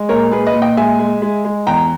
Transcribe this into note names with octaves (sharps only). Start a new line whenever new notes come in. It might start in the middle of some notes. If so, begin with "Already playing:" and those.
Already playing: G#3
A#2 A#4 C#5
A#2 G#4 B4
B4 D#5
A#2
D#5 G5
G#3 E5 G#5
G#3
G#3
G#3
E2 G5 A#5